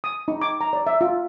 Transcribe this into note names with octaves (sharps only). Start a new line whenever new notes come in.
D#6
D#4
D6
A#5
D5
E5
F4